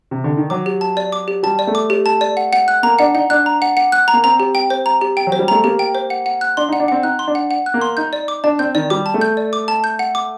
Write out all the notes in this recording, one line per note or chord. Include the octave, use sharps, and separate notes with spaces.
C3
D3
D#3
F#3 D6
G4
A5
D5
D6
G4
G3 A5
D5
A3
D6
G4
A5
D5
F#5
F#5
F#6
A#3 A#5
D4 F#5
D#4 F#5
D4 F#6
A#5
F#5
F#5
F#6
A#5
A#3
C4 A#5
G4
G5
C5
A#5
G4
G5
F#3
C5
G3
A3 A#5
A#3 G4
G5
C5
F#5
F#5
F#6
D4 C6
D#4 F#5
D4
C4 F#5
D#4 F#6
C6
D4
F#5
F#5
F#6
A#3
C6
D#4 G6
D5
D6
D4 A5
C4 G6
D#3 D5
G3 D6
A5
A3
G6
D5
D6
A5
G6
F#5
D6